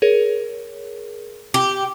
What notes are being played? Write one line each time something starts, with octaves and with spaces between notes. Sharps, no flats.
G#4 A#4 C#5
G4